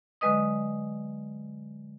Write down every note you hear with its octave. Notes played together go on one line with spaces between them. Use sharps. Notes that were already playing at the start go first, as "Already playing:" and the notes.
D3 F#3 G#3 B4 D#5 D#6